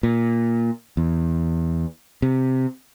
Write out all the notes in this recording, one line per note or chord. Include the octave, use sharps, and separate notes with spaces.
A#2
E2
C3